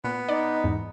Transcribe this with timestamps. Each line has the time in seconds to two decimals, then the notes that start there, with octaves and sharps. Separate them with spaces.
0.04 A#2 B3
0.28 D#4 D5
0.64 E2 G#2